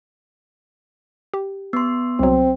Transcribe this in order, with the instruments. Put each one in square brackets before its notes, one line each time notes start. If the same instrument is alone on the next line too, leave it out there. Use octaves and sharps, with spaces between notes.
[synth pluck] G4
[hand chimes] B3 C6
[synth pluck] C2 F#3 [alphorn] C4